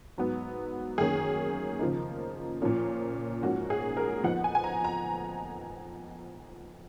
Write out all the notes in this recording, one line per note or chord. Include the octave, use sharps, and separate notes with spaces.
G#2 F#3 B3
F#2 D#3 A#3 C#4 G#4
C#3 F3 A#3 D#4
A#2 F3 A#3 C#4
G#2 F3 A#3 C#4 F#4
G#4
A#4
F2 F3 B3 D#4 F#5
G#5
G#5
A#5
A#5